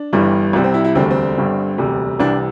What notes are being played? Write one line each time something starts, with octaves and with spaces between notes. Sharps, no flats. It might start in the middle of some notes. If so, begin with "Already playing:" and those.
Already playing: D4
G1 G2 E3 G3
C2 C3 G3
C4
E4
E4
E1 D2 D3 G3 C4
A3
C4
G1 G2 D3 G3
E1 D2 C3 G3
C2 C3 E3 G3 D4